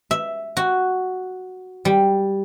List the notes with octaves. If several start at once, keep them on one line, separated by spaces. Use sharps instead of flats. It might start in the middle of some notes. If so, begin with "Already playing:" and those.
E5
F#4
G3